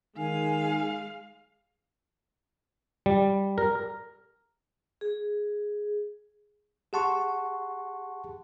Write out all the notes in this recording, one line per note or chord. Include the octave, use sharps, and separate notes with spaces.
D#3 G#3 F5 G#5
G3
A#4
G#4
G4 G#4 F#5 A5 C6 C#6